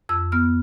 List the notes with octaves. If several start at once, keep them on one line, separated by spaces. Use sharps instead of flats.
F2 E6
B3 F6